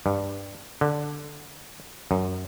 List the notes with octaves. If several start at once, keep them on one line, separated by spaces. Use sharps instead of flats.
G2
D3
F#2